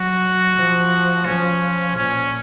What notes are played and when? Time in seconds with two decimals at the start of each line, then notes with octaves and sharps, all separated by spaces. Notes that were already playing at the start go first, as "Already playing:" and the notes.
Already playing: F#3 F#4
0.56 F3
1.25 F3 C#4
1.95 A#2 C#4